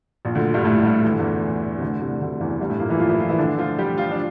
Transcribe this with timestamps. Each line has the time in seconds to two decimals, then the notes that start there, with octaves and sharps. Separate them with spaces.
0.25 A#1 A#2
0.35 D2 D3
0.54 G2 G3
0.64 A2 A3
0.83 G2 G3
1.04 E3
1.11 D3
1.18 E2 E3
1.78 C3
1.82 D2 D3
2.01 C2 C3
2.21 D2 D3
2.40 E2 E3
2.61 G2 G3
2.70 A2 A3
2.80 A#2 A#3
2.89 E3 E4
2.99 F3 F4
3.09 E3 E4
3.19 F3 F4
3.29 E3 E4
3.38 D3 D4
3.58 F3 F4
3.78 G3 G4
3.97 F3 F4
4.11 D4